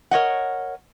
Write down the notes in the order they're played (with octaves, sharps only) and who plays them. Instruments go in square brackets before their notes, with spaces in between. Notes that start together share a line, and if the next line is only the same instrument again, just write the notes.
[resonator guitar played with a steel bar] A#4 C#5 D#5 F#5